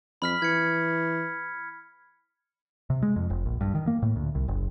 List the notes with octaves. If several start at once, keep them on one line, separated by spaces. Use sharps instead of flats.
F2 B5 F6 B6
E3 G#6 C#7
C3
G#3
F2
F1
A#1
G2
D#3
A#3
A2
D2
C2
F#1